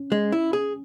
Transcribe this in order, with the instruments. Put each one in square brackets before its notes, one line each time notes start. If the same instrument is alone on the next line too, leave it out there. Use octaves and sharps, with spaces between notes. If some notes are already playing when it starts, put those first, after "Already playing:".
Already playing: [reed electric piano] C#4
[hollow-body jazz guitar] G#3
E4
G#4